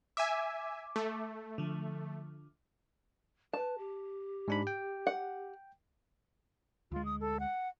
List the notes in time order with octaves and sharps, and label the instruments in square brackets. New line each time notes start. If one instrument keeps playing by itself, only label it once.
[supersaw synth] E5 G#5 [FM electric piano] D6
[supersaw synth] A3
[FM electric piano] D3 F3
[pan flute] B4 [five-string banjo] A5
[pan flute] G4
[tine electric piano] G#2 D4 B5
G5
[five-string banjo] F#5
[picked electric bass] D2 G#3 [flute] F4
[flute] D#6
A4
F#5